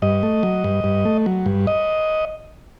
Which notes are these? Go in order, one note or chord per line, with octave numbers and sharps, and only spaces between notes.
G2 D#5
A3
F#3
G2
G2
A3
F#3
G2
D#5